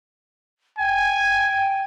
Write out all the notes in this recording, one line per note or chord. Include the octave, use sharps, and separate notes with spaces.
G5 G#5